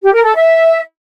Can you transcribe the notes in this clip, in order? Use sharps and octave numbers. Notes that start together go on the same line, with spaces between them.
G4
A#4
A4
E5